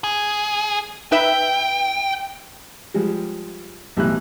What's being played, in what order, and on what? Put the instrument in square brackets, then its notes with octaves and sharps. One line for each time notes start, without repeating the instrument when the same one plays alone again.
[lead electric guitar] G#4
[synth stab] D#4 B4 E5 [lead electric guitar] G5
[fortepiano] F3 G3 G#3
B1 A2 E3 G3 F#6